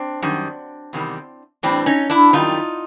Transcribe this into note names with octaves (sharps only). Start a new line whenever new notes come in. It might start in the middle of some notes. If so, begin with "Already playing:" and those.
Already playing: C4 D4
F#2 D#3 G3
E2 C3 D#3 G3
A2 E3 G3 C4 D4
C#4 D#4
D4 E4
F#2 D#3 G3 D#4 F4